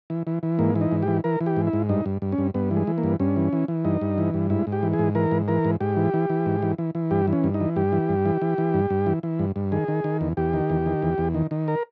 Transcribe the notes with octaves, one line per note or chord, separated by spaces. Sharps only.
E3
E3
E3
G#2 A#3
E3
D#4
G#2
G4
E3
E3 A#4
E3
G4
G#2
E4
G#2
G2 D#4
G2
G2
C#4
G2
G2 B3
E3
G#3
E3
A#3
G2
G2 C#4
E3
E3
E3
G2 D#4
G2
E3
G2
G#2 E4
G#2
G4
E3
G#4
G#2
E3 A#4
G#2
E3 A#4
G#2
G#2 G4
E3
E3
E3
G#2
E3
E3
E3
G2 G4
E3
C#4
G2
D#4
E3
G2 G4
E3
G2
E3
E3
E3
G2
G2
E3
E3
G2
G2
D#3 G#4
D#3
D#3
E2
E2 G4
D#3
E2
D#3
E2
E2
D#3
D#3
A#4